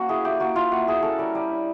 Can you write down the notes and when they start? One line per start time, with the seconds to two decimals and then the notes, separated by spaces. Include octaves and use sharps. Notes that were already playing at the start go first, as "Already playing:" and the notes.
Already playing: A#3 C#4 F#4
0.09 E4 G#4
0.25 E4 G4
0.40 A#3 F#4
0.56 E4 F4
0.72 A#3 F#4
0.87 E4 G#4
1.03 C#4 A4
1.19 G3 A#4
1.35 G3
1.50 D4